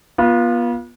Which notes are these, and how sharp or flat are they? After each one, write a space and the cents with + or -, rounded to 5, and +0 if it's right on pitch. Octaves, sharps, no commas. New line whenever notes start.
B3 -35 F4 +0